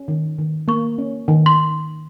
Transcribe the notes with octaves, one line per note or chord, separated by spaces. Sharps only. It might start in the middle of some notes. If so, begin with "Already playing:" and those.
Already playing: C#4
D#3
D#3
A#3 C#6
C#4
D#3
C6